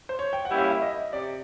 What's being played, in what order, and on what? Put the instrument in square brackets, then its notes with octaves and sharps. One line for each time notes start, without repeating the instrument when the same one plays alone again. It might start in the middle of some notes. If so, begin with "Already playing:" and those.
[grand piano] C5
C#5
G5
F#5
[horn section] G3 A#3 C#4 E4
[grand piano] F5
E5
D#5
[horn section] C3 [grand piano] D5